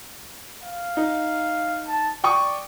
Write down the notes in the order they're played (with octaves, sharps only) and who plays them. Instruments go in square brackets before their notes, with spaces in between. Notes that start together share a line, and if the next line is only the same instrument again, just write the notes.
[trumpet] F5
[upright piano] D#4
[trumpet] A5
[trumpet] D5 [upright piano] G5 C#6 D#6